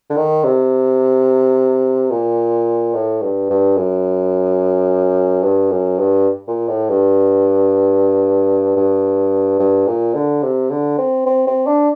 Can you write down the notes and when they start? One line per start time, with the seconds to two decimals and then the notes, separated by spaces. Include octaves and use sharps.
0.10 D3
0.17 D#3
0.44 C3
2.11 A#2
2.94 A2
3.22 G2
3.50 G2
3.77 F#2
5.44 G2
5.71 F#2
5.99 G2
6.48 A#2
6.68 A2
6.89 G2
8.77 G2
9.59 G2
9.87 A#2
10.15 D3
10.43 C3
10.70 D3
10.98 C4
11.26 C4
11.47 C4
11.67 D4